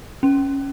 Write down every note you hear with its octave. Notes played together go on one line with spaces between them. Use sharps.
C#4